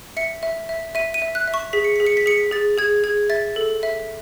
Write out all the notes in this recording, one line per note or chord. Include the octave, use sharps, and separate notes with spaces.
E5 C#7
E5
E5
E5 D#7
D#7
E5
F#6
E5
C#6
G#4 B6
C#7
G#4 B6
C#7
B6
G#4 C#7
B6
G#4 A6
G#4 G#6
G#4 G#6
E5 A6
A4
E5